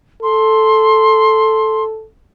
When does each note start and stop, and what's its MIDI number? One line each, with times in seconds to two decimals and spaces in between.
0.23 2.05 69
0.23 1.84 84